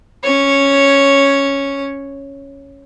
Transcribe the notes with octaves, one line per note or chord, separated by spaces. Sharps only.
C#4 C#5